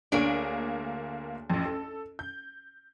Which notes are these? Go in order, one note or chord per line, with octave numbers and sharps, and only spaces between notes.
D2 A#3 D4 G#4 C#5 D7
A1 F2
A4
G6